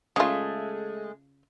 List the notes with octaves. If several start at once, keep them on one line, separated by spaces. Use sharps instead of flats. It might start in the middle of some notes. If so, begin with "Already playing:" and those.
C#3 G#3 A3 F4